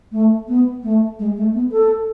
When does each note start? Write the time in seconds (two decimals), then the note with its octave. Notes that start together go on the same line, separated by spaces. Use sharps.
0.12 A3
0.48 B3
0.83 A3
1.19 G#3
1.37 A3
1.54 B3
1.72 A4